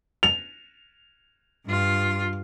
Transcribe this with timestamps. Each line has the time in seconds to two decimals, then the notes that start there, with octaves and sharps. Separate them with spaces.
0.23 F7
1.66 G2 F4